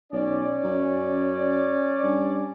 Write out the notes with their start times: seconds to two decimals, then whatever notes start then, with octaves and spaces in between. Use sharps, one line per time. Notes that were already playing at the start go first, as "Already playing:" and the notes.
0.13 B1 C#4 D5
0.64 F#2
2.04 G2